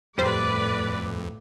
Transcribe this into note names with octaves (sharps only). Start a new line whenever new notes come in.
F2 A2 G3 B4 C5 D5